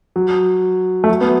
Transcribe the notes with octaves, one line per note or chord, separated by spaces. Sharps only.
F#3
A3
F#3
B3